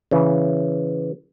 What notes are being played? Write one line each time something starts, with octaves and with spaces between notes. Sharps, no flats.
C#3 E3